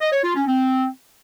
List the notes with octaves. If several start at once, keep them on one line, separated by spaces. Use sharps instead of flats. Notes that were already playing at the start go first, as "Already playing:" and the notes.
D#5
C#5
F4
C#4
C4